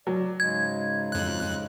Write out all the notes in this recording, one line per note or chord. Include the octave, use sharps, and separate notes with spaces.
F#3 D5
G#2 C#3 G#3 G#6
F2 F#6